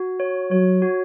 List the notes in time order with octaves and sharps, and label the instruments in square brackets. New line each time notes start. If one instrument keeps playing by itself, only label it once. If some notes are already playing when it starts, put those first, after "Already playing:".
Already playing: [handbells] F#4
C#5
[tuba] F#3 [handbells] C#5
[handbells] F#4